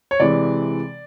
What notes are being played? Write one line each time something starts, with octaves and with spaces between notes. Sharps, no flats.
C#5
C3 E3 G#3 D5